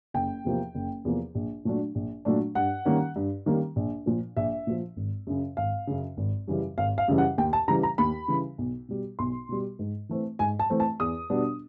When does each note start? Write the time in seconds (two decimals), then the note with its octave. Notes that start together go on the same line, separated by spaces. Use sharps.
0.14 F#1 G5
0.45 E2 C3 F3 A#3
0.75 F#1
1.05 E2 C3 F3 A#3
1.35 A#1
1.65 A#2 F#3 A3 D4
1.95 A#1
2.25 A#2 F#3 A3 D4
2.55 G2 F#5
2.85 D#3 G3 A#3 C#4
3.16 G2
3.46 D#3 G3 A#3 C#4
3.76 A#1
4.06 A#2 F3
4.37 A#1 E5
4.67 A#2 F3
4.97 G#1
5.27 F#2 C#3
5.57 G#1 F5
5.87 F#2 C#3
6.17 G#1
6.48 F#2 C#3 E3 G3
6.78 G#1 F5
6.98 F5
7.08 F#2 C#3 E3 G3
7.18 F#5
7.38 D#2 G5
7.53 A5
7.68 C#3 E3 G3 A#5
7.83 A#5
7.98 D#2 B5
8.28 C#3 E3 G3
8.58 B1
8.89 B2 G3
9.19 B1 C6
9.49 B2 G3
9.79 G#2
10.09 E3 A3 C4
10.39 G#2 G#5
10.59 A5
10.70 E3 A3 C4
10.80 A5
11.00 E2 D#6
11.30 B2 G3 B3 D4